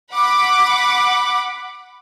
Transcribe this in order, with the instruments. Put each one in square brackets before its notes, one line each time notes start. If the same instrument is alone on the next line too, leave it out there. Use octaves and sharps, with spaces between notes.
[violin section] F#5 B5 D6